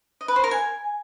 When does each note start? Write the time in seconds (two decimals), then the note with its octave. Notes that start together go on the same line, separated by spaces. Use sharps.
0.21 D#5
0.28 B4
0.36 C5
0.44 A#4
0.51 G#5